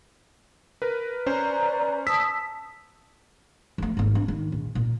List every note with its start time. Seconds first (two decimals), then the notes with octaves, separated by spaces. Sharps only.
0.82 A#4 B4
1.26 C#4 B4 C5 D5 A#5
2.07 A5 D#6 E6 B6
3.78 F3 A3
3.97 G#1 A#3
4.15 D4
4.28 D#3
4.52 A#1
4.75 A#2